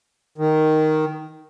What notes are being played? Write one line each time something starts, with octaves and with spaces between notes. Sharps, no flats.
D#3